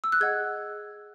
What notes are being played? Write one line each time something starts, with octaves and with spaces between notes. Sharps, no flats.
E6
F#6
G#4 D#5 F#5 G#6